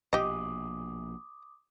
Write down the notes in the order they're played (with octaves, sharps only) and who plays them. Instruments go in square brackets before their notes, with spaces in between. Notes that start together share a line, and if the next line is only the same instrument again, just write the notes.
[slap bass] A#1 B2 [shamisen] G4 D#5 [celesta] D6 D#6